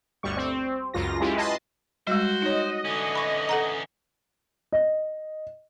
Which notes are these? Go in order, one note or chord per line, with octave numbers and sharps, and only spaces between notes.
G1 D2 G3 C#6
C4
C#2 F#2 F4 A#6
G#3 C#4 E4 F4 G4
B4 D#5 A5 C6
G3 G#3 F#4 C5
D#4 C#5 D#5
D3 E3 C#4
B5 C#6
A4 F#5 A#5
D#5